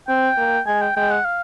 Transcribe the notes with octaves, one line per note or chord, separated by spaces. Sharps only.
C4 G5
A#3
G#3 G#5
G5
G#3 G5
F#5
F5